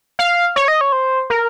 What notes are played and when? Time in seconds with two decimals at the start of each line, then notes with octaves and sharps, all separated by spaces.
0.19 F5
0.56 C#5
0.68 D#5
0.81 C#5
0.92 C5
1.30 A#4